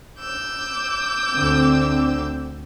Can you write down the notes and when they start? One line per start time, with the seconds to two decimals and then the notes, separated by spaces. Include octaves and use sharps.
0.19 D6 E6 G6
1.34 D2 D3 C4